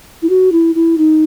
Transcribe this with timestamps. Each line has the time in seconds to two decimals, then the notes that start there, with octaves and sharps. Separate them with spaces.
0.22 E4
0.29 F#4
0.52 E4
0.75 E4
0.98 D#4